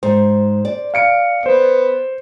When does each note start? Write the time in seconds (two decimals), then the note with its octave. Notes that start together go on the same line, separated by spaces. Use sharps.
0.03 G#2 C5
0.65 D5
0.94 F5 C#7 D7
1.46 B3 C5